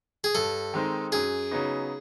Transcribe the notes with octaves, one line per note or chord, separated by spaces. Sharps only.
G#4
G2 A4
D#3 G#3 C4 D#4
F#2 G#4
C#3 F#3 B3 D#4